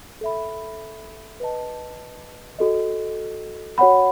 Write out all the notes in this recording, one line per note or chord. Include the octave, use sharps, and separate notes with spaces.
A4 E5 B5
B4 D#5 A5
F#4 A4 D#5
F#4 C#5 F#5 B5